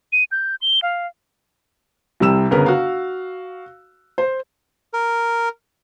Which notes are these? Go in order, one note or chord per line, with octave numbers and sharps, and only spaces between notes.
D#7
G6
G7
F5
C2 C3 G3 E6 E7
G1 C#3 B3 A#4 B4 F6
F#4 F5
C5
A#4